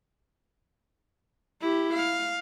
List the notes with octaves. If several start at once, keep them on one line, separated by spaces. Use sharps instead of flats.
E4 G4
F5